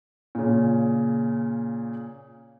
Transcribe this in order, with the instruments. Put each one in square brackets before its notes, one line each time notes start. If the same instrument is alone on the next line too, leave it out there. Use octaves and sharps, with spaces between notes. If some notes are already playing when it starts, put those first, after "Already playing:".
[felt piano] A#2 C#3